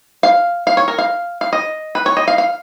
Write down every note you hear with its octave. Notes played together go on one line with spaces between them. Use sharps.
F5
F5
C#5
A#4
F5
F5
D#5
B4
C#5
D#5
F5
F5